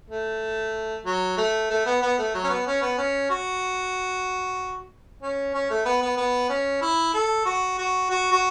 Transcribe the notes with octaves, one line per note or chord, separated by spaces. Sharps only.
A3
F#3
A3
A3
B3
B3
A3
F#3
C#4
B3
C#4
B3
C#4
F#4
C#4
C#4
A3
B3
B3
B3
C#4
E4
A4
F#4
F#4
F#4
F#4